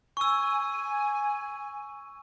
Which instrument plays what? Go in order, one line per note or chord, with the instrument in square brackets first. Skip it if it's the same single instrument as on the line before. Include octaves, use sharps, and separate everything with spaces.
[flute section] G#5 [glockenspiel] C#6 E6